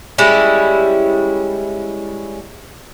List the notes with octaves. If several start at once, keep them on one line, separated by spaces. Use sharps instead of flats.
G3 G#3 C#4 E4